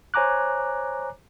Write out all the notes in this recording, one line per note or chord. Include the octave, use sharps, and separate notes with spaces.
C5 C#5 G#5 A#5 D6 F#6